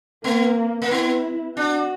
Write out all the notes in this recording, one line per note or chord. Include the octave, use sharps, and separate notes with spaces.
A#3 B3
A#3
B3 E4
D4 F#4